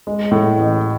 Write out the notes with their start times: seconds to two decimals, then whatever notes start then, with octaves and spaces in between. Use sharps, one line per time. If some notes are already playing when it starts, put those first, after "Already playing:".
0.07 G#3
0.31 A2
0.57 A1